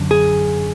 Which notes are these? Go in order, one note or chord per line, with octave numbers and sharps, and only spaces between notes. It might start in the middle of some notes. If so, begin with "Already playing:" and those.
Already playing: F#2 D3
G#4